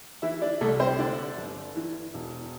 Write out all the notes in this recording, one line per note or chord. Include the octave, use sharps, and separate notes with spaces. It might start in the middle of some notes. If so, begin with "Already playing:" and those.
E3 E4 E5
D4 D5
C2 A3 A4
C4 C5
D3 D4 D5
G1
E3
E1